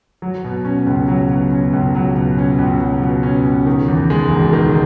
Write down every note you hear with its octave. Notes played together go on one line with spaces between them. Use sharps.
F#3
B2
C#4
C#2
F#3
B2
C#4
C#2
F#3
B2
C#4
C#2
F#3
B2
C#4
C#2
D#3
E2
G#3
E1
D#3